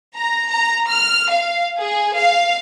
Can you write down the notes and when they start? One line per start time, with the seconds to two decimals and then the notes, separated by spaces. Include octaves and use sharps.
0.17 A#5
0.51 A#5
0.90 F6
1.30 F5
1.80 G#4
2.16 F5